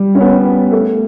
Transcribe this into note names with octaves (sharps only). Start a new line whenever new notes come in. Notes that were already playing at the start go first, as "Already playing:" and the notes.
Already playing: G3
C#4
B3
A3